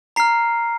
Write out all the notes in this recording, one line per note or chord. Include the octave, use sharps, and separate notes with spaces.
A#5 F6 C7